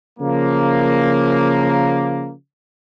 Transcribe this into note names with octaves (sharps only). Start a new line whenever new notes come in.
C#3 F3 A#3